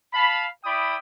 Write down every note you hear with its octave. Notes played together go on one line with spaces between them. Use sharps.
F5 A5 B5
E4 D5 G5 B5 D#6